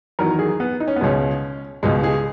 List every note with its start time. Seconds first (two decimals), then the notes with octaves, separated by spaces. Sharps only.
0.19 E2 D#3 F#3 A#4
0.39 G#4
0.60 B3
0.80 D#4
0.88 C#4
0.96 B3
1.01 C#2 B2 G#3 C#4
1.83 C#2 B2 G#3
2.03 G#4